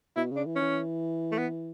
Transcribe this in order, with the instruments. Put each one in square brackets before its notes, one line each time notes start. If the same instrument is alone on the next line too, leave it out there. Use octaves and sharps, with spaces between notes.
[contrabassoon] B2 [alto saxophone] E4
[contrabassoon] C#3
[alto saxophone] D4
[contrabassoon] E3
[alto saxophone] C#4
[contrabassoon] E3
[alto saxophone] A3
B3